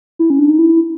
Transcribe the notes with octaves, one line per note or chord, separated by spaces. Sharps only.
E4
C#4
D4
D#4
E4